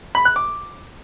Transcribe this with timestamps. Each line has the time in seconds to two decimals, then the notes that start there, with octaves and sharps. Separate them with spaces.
0.15 B5
0.25 F#6
0.36 D6